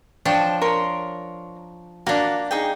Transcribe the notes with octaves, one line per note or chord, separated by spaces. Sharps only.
F3 D4 C#5 G5
A#4 C#5 C6
A#3 D4 F#4 F5
D#4 G#4 G5